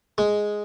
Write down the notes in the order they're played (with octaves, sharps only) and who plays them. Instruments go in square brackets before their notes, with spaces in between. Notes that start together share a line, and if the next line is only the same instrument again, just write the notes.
[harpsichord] G#3